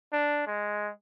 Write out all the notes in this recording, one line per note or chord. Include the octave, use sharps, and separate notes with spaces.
D4
G#3